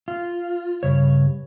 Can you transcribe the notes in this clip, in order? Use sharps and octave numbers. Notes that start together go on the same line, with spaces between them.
F4
G2 C#3 C#5